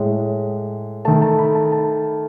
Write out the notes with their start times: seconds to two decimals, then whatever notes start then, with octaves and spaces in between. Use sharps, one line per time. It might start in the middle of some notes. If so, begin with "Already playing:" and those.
Already playing: A2 G#3
1.05 D#3 A3 A5
1.22 A5
1.39 B5
1.55 A5
1.72 A5